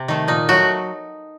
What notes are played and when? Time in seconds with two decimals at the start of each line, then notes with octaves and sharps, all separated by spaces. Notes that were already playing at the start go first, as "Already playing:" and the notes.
Already playing: C3
0.08 D#3 A3
0.28 A#2 D#4
0.49 F#3 A3 F#4